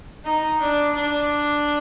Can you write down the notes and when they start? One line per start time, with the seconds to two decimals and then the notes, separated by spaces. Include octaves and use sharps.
0.25 D#4
0.60 D4
0.95 D4